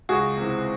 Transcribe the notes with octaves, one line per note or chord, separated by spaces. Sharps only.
C#2 F#4 G#4
C3 E3